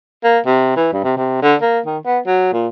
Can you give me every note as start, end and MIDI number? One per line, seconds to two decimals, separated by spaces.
0.24 0.39 58
0.46 0.72 48
0.76 0.89 52
0.93 1.02 43
1.04 1.13 48
1.17 1.40 48
1.42 1.55 50
1.62 1.79 58
1.86 1.98 51
2.05 2.19 59
2.26 2.51 54
2.53 2.67 46